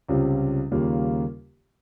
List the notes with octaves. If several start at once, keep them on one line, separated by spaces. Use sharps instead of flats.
C#2 C3 G3 C#4 F4
D#2 C#3 G3 A#3 F4